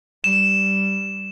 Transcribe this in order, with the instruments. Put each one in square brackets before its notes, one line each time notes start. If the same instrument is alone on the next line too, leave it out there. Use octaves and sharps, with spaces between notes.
[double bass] G3 [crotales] E7